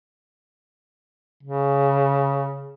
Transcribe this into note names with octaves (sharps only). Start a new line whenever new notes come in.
C#3